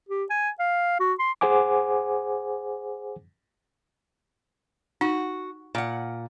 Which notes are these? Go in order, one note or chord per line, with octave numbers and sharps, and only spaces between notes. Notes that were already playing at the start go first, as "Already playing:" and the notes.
G4
G#5
F5
F#4
C6
G#4 C5 F#5 G#5 D6
D#4 F#4
A#2 F#5